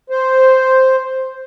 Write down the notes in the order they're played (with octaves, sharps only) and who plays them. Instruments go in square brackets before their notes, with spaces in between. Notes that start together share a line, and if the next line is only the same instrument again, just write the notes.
[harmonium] C5